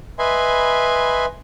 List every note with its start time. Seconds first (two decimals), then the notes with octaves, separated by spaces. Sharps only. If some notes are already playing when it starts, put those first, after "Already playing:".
0.19 B4 D#5 E5 G#5 B5 C6